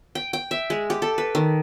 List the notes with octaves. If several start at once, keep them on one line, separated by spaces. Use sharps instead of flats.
G5
G5
E5
G#3
G4
A4
B4
D#3